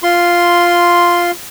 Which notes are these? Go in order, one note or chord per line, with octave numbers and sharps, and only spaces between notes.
F4 C6